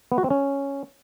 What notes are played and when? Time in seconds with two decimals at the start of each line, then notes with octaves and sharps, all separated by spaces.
0.12 B3
0.18 F#4
0.24 C4
0.30 C#4